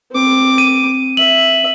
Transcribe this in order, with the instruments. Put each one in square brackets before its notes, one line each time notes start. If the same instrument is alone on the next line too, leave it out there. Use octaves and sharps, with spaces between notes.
[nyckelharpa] C4 D6
[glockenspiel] D#7
[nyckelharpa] E5 [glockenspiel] F#7